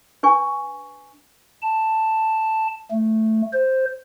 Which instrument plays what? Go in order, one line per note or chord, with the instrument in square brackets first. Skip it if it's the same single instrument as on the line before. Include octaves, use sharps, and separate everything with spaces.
[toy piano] D4 B4 G#5 C#6
[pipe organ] A5
A3
C5